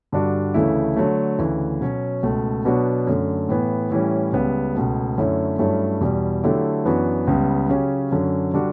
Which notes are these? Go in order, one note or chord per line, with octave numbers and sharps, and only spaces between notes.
G2 D3 G3 D4 F#4
D2 C#3 E3 A3 E4
D3 F#3 A3
D2 C#3 E3
B2 F#3 C#4
C#2 B2 A3
B2 F#3 B3 D4 F#4
F#2 D3 A3
A2 E3 B3
A2 E3 G3 C#4
C#2 C#3 G3 B3
C#2 B2 A3
F#2 D3 A3 C#4 E4
G2 F#3 A3 C#4 E4
E2 B2 G3
D3 F#3 A3 E4 G4
F#2 E3 B3 D4 F#4
C#2 C#3 G3 B3
C#3 F#3 C#4 G4
F#2 D3 F#3 C#4
D3 G3 D4 F#4